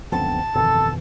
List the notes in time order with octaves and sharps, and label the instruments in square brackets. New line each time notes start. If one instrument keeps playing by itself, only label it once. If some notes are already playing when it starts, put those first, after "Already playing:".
[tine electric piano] C#2 F#2 D3 [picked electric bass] F3 B3 C4 [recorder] A5
[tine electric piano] G1 F2 D#3 [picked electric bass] B2 E3 [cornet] A4